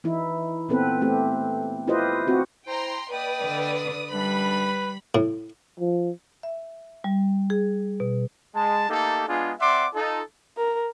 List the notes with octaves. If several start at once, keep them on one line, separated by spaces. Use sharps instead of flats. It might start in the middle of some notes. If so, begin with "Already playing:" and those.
E3 D#4 E4
A#2 B3 C4 A4 B4
A3 C4 G4
E4 F4 G4 B4 C5 D#5
C4 F#4 G4
E4 C5 G5 A#5 C6
A#3 B4 D5 D#5 G5 D#6
D3
F#2 D3 G3 D4 B4 B5
A2
F3
E5
G3
G#4
B2
G#3 A5
A3 A#3 D#4 G4 A4
G#3 B3 D4 F4 G#4
C4 D5 E5 F#5 C6 D6
D#4 F4 A4
A#4